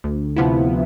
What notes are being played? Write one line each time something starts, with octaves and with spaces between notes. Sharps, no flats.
D2
C3 F3 B3 E4